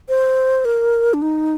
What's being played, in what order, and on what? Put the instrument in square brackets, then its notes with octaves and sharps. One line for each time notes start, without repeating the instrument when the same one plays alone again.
[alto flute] C5
A#4
D4
D#4